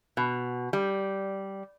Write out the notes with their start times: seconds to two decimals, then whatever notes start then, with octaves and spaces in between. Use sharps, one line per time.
0.17 B2
0.73 G3